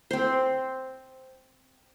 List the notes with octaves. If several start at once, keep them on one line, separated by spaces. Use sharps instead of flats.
C4 C5